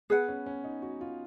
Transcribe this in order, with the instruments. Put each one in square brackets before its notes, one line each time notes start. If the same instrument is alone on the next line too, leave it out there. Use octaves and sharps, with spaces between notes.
[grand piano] B3 [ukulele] G#4 B4 F#5
[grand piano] C#4
C#4
D#4
F#4
F4